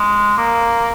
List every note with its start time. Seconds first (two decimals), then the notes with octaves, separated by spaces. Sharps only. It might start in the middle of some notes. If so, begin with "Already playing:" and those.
Already playing: G#3
0.37 A#3